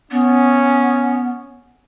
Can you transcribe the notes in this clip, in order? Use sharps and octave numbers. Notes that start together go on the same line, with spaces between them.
B3 C#4